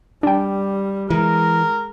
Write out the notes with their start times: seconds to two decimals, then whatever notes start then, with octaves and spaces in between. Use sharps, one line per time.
0.23 G3 D4 G5
1.10 E3 G#3 A#4